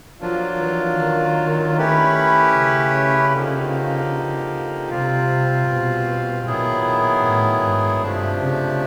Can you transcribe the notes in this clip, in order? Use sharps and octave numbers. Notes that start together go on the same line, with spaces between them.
F3 F#3 A#3 D4 F4
E3
D#3
A3 C#4 E4 G4 B4
C#3
D3 F3 A#3 D#4 G4
C3 G3 C4 F4
B2
A#2 D#3 F#3 B3 E4 G#4
A2
G#2
G2 C3 F3 A3 D4
C#3